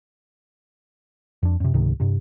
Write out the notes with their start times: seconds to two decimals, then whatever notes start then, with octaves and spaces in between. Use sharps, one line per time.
1.43 F2 D4
1.60 F#2 C3
1.74 C#2 G#2 C3 D#3
2.00 G2 C3